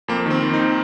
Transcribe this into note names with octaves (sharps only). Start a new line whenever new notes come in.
F2 A#3
D#3 C4
D#3
D#4